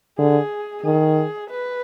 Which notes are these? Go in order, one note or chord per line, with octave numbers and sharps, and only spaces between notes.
D3 G#4
D#3 G#4
B4